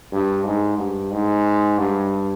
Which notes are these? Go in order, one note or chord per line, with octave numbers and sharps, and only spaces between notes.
G2
G#2
G2
G#2
G2